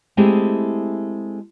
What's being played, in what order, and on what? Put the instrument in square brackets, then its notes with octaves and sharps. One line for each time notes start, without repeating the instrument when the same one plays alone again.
[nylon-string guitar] G#3 A3 C4 E4 G4 G#4